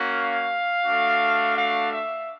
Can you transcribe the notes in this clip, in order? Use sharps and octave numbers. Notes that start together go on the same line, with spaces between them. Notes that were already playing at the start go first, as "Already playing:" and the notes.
Already playing: A#3 C#4 F#4
F5
A3 D4 F#4
F5
E5